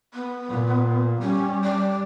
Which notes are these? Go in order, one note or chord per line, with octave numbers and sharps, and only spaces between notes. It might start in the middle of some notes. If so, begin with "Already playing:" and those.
B3
A#2
G3 C#4
D5